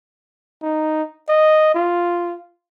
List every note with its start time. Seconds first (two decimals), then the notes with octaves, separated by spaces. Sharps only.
0.63 D#4
1.29 D#5
1.75 F4